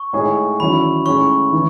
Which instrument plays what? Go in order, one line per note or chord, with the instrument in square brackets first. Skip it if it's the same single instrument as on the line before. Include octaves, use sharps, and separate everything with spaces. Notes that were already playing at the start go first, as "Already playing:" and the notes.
Already playing: [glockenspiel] C#6
[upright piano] A2 G#3 D#4 G#4 C#5
[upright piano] E2 D#3 F#3 C#4 E4 [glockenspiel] B5
[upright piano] A2 G#3 C#4 [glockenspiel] C#6
[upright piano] E3